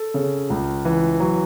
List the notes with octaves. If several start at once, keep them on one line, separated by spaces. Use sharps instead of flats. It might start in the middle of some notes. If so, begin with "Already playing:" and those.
Already playing: A4
C#3
C#2
E3
F#3